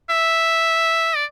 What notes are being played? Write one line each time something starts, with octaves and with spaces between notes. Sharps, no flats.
E5
D5